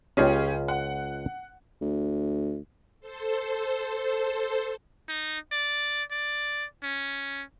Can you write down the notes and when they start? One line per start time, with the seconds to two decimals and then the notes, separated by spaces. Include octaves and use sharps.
0.17 C#2 C#4 F4 G4 G#4 D#5
0.68 F#5
1.81 D2
3.00 A4 C5
5.09 D#4
5.52 D5
6.11 D5
6.83 C#4